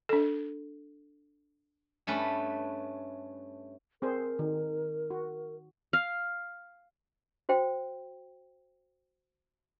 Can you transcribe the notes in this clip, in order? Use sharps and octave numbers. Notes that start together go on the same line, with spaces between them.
D4 A4
G2 A3 C#4 B4
C4 G#4 A#4 C5
D#3
F#4
F5
F#4 C5 G5